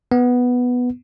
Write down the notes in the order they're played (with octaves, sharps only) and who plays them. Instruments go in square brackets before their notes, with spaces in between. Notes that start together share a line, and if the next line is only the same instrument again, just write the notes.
[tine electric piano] B3